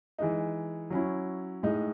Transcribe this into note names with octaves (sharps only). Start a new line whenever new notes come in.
E3 G#3 D#4
F#3 C#4 E4
A2 G#3 D#4